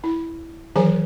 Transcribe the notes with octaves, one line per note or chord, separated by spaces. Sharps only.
E4
D#3 E3 F#3 G#4 C5 G#5